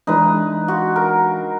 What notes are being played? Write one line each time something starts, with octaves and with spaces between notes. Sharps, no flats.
E3 G#3 D4 D#4 B4
F#4 C5
A#4